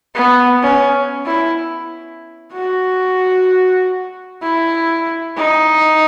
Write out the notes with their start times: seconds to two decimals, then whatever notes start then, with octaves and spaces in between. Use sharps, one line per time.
0.15 B3
0.63 C#4
1.26 E4
2.53 F#4
4.42 E4
5.37 D#4